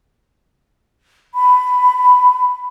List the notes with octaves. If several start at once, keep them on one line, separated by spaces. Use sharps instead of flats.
B5